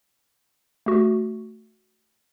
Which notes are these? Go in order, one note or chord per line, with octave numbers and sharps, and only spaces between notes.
A3 F#4